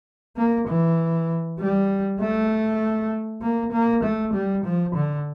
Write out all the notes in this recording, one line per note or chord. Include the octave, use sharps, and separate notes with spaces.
A#3
E3
G3
A3
A#3
A#3
A3
G3
F3
D3